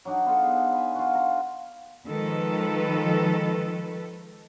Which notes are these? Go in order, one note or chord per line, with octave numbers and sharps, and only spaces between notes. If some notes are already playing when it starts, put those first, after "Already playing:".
F#3 D4 D#4
B3 F4 A4
G#4
G#5 B5
F4 F#4
A#5
D#3 F3 G#3 A4 B4